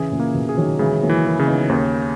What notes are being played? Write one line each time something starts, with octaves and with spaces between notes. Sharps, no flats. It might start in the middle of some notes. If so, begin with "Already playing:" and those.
Already playing: C#3 E3 G#4
A#2 C#3
A#3
B2
G#4
D#3 F#3
C#3 E3 G#3
F#3 A#3
E3
F#3 A#3
C#3
B3 D#4
D#2 A#3 C#4